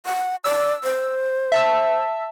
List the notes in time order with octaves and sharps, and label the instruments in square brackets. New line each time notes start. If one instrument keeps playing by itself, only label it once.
[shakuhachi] F#5
[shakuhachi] D5 [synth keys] E6
[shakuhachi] C5
[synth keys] E5 A5 E6